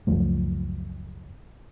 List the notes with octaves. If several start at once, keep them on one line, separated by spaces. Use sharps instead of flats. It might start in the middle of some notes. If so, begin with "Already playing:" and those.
C#2 F#2 F3 A3